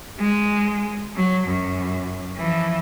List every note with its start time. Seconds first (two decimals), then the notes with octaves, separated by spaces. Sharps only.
0.20 G#3
1.16 F#3
1.48 F#2
2.37 E3 F3